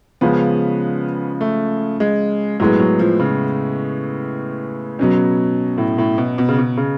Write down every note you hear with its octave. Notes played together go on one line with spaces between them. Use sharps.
C#3 F3 G#3 B3 C#4
A3
G#3
A2 F#3 G#3 B3
F#3
F3
C#3
B2 F#3 C#4
A2
A2
B2
B2
C#3
B2
C#3